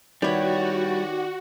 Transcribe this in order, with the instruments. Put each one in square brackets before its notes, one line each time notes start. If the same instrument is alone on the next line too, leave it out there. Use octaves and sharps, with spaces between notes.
[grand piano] D#3 G4 D5 [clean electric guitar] G3 E4 [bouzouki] B3 C#5 [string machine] F#4